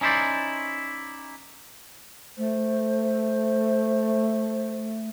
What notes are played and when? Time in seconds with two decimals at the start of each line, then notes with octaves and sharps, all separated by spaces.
0.01 C#4 D#4 E4 C5 D5
2.38 A3 C5